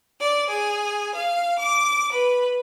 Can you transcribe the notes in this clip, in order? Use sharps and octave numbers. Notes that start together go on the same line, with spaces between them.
D5
G#4
F5
D6
B4